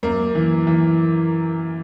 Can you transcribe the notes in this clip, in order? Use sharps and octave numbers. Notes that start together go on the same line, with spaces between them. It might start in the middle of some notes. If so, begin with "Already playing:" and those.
F#2 A#3
E3
E3